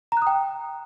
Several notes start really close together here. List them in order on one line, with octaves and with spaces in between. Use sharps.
A#5 F#6 D#6 G5